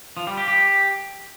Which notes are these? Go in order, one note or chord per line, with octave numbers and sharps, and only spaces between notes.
F3
G3
G4
G4